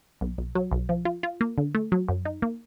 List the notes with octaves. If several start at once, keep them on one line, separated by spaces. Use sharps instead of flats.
B1
B1
F#3
B1
F3
F4
F4
A#3
D3
A3
F#3
F#2
D#4
A#3